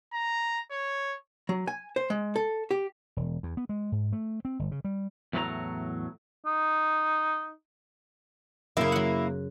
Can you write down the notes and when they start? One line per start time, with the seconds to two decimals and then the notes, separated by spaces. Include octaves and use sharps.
0.13 A#5
0.71 C#5
1.49 F#3
1.67 G#5
1.96 C5
2.10 G#3
2.36 A4
2.71 G4
3.17 E1
3.43 E2
3.57 B3
3.69 G#3
3.92 G#2
4.13 A3
4.45 C4
4.59 G1
4.71 C#3
4.84 G3
5.33 E2 A2 F#3 E4 A4 A#5
6.46 D#4
8.77 F#2 C#3 A#3 E4
8.92 F#3 F#5